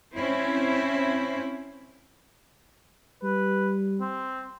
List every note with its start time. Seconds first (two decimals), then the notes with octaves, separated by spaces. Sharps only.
0.15 C4 C#4 E4 C5
3.23 G3 B4
4.00 C4